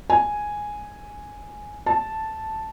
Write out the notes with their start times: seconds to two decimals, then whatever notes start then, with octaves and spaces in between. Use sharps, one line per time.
0.10 G#5
1.86 A5